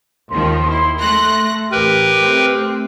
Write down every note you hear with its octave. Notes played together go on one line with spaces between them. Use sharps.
D#2 D#3 F3 C6
E4 C6
A3 F#6 A#6
A1 G4 A#4 B4
A3 C4